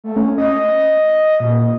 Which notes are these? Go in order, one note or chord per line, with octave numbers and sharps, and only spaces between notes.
A3
C#4
D#5
A#2